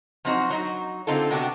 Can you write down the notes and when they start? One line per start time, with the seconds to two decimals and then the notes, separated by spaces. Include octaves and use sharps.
0.25 F3 F#3 C4 D#4 F#4
0.50 F#3 D#4 F#4
1.07 D3 C4 D#4 F4 A4
1.30 C3 B3 D4 F#4 G4